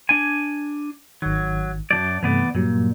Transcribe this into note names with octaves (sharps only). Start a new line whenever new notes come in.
D4 G#5
G#1 D#3 F#3
F#2 C#3 F#3 D5 A5
G2 C3 E3 A3 B3 D5
G2 A#2 F#3 G3